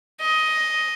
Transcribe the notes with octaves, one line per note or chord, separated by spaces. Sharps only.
D#5